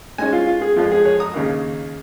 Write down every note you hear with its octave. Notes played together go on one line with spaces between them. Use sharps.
G#2 G#3 C#4 D#5 G#5
F4
F4
G#4
F2 F3 G#3 F4
G#4
G#4 C#5
A#5 D#6
D#2 C#3 A#3